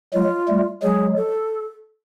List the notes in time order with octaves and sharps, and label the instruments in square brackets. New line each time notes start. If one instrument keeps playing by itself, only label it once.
[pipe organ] F#3 G#3 [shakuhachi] F4
[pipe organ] G3 A3
[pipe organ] F#3 G#3 [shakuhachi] G#4
[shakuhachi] A4